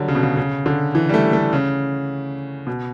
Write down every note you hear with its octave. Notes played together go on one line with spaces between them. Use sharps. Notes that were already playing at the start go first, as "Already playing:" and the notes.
Already playing: D3 F#3 G3
C#3
B2
C#3
C#3
D3
E3
G3
A3
A3
C#3
B2